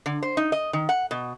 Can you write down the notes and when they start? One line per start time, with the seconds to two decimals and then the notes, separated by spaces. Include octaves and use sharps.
0.06 D3
0.23 C5
0.37 D#4
0.52 D#5
0.73 D#3
0.89 F#5
1.11 B2